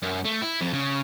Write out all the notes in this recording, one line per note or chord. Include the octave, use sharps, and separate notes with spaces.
F#2
A3
E4
F2
C#3